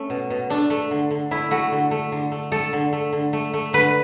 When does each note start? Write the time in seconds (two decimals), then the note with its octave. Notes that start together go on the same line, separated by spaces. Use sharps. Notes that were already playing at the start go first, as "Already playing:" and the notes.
Already playing: A3 C#4
0.10 B2
0.30 B2
0.50 A3 D4
0.70 A3
0.91 D3
1.10 D3
1.31 A3 E4
1.51 A3 F#4
1.72 D3
1.91 A3
2.12 D3
2.32 A3
2.52 A3 A4
2.73 D3
2.93 A3
3.13 D3
3.33 A3
3.54 A3
3.73 D3 B4